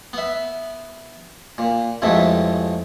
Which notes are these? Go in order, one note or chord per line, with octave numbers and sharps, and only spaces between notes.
B3 E5
A#2
A1 F2 G#2 A3 E5